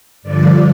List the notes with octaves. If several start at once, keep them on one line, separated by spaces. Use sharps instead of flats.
G2 D3 F3 D5